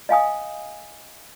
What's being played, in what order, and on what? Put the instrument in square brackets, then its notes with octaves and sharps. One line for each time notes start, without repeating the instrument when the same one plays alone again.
[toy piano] D#5 F5 G#5 D#6